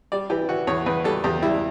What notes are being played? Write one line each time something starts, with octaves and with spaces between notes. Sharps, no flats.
G3 D5
E3 G4
E3 F#4
E2 C#5
E2 B4
G3 A4
E2 G4
G3 E4